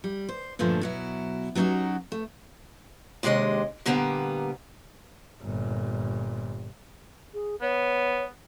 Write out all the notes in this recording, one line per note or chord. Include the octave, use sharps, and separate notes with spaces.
G3
C5
G2 A#2 D3 F3 A3
B2 F#3 E4
F#3 B3 C#4 D#4 F#4 G4
A3
D#2 C3 G#3 D4 D#5
A#2 D3 G3 A#3 B3
G1 A#2
G#4
B3 C#5